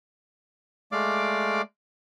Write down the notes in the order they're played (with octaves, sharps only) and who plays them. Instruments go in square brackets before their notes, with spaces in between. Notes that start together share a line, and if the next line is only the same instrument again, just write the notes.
[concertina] G#3 A3 D5 F5 D6